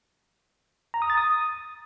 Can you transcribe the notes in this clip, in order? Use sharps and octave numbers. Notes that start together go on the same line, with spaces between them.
A#5
D#6
A6
D#6